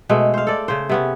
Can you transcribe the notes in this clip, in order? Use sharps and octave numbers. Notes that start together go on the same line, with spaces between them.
B2 G#3 A3
C5 F5
A4 D5
C#3 C5
C3 B3 C#4